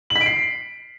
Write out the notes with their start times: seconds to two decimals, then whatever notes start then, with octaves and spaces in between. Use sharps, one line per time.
0.10 F#7
0.16 B6
0.21 D7
0.26 C7